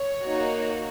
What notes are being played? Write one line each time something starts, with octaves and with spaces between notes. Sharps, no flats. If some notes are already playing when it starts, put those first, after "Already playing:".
Already playing: C#5
A#3 D#4 F#4